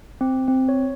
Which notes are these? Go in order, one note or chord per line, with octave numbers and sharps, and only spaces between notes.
C4
C4
C#5